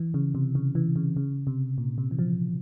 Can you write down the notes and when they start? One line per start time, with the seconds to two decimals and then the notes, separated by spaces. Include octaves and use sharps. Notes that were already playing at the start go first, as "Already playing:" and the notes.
Already playing: E3
0.14 C#3
0.35 C3
0.55 C#3
0.75 E3
0.96 C#3
1.17 C#3
1.47 C3
1.78 A#2
1.98 C3
2.11 E3
2.19 F3